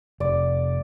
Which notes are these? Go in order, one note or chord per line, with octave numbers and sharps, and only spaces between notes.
F1 D5